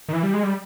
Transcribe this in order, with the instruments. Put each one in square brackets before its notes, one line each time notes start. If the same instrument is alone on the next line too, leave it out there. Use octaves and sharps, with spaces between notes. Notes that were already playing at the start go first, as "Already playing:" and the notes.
[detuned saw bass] D#3
E3
G3
G#3
G3